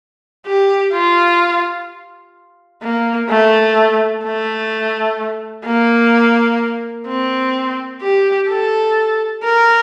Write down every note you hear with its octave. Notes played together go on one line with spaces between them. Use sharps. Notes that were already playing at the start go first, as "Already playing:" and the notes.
G4
F4
A#3
A3
A3
A#3
C4
G4
A4
A#4